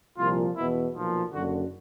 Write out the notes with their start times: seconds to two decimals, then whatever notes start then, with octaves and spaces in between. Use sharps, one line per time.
0.18 C2 A#2 F3 F4
0.56 E2 B2 E4
0.94 B1 A#2 F3
1.31 F#1 F#2 D3 F#4